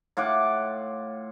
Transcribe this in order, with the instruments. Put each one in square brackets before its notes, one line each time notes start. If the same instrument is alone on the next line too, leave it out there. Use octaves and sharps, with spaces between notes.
[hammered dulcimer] A2 F4 F#5 D6